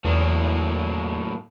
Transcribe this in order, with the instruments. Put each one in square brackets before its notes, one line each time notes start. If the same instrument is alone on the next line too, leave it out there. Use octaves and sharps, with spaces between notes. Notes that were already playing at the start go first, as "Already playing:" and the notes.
[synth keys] E2 [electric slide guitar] A2 F#3 A#3